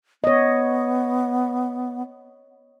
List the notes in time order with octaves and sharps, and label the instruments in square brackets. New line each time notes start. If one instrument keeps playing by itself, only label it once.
[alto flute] B3 [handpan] C#5 D#5